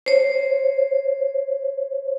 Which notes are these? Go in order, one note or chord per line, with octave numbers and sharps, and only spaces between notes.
C5 C#5